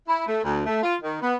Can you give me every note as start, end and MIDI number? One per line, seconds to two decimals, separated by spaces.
0.08 0.24 64
0.27 0.39 57
0.44 0.63 38
0.66 0.81 57
0.83 0.95 65
1.02 1.21 51
1.22 1.35 59